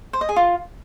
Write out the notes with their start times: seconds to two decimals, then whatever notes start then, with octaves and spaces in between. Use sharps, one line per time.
0.13 C5
0.21 D#5
0.29 G#4
0.36 F4